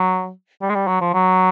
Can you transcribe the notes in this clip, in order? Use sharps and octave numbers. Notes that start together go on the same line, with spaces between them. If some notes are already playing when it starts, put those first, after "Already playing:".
Already playing: F#3
G3
G#3
G3
F#3
F3
F#3